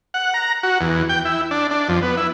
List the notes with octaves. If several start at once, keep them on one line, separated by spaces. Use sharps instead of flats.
F#5
A#5
F#4
E2
G5
E4
D4
D4
F2
B3
E4